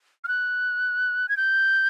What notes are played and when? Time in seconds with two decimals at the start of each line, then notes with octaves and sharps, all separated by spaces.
0.24 F6
0.28 F#6
1.29 G#6
1.37 G6